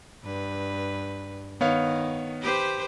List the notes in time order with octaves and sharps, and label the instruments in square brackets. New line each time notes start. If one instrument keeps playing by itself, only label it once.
[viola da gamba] G2 B4
[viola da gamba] D#3 [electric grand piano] B3 C#5 F5
[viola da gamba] G4 B4 C5